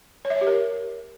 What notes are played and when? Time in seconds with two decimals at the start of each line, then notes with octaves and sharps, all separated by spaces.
0.25 C#5
0.30 E5
0.36 C#5
0.41 G4
0.47 A#4